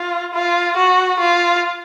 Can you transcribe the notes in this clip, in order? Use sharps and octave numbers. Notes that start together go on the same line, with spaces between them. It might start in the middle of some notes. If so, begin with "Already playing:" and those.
Already playing: F4
F4
F#4
F4